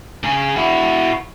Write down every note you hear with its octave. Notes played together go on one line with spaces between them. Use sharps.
C#3 G#4
E4 F#4